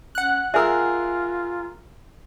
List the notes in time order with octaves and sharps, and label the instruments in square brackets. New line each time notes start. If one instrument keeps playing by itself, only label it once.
[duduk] C#4 [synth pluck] F#5 F#6
[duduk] F4 [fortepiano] G#4 A#4 E6 [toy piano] E5 G#5 D#6